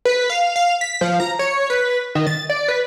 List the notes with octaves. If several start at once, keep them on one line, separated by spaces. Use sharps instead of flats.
B4
F5
F5
B6
F3
A#5
C#5
B4
D#3
A6
D5
B4